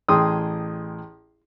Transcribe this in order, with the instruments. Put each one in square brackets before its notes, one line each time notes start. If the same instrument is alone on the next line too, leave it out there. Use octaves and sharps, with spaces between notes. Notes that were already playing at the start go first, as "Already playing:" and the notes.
[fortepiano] A1 G#4 G5 C6 D#6